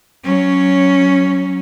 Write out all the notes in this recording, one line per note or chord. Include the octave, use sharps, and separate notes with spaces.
F#3 C#4